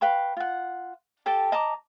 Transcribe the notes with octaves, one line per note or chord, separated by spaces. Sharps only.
B4 F5 G5 C#6
F4 F#5
G4 A4 G5 A5
D#5 A5 A#5 D6